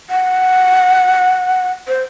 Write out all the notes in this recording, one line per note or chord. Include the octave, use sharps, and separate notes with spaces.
F#5
C5